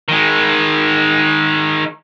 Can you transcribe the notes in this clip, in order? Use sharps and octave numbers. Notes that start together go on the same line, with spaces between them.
D#3 G#3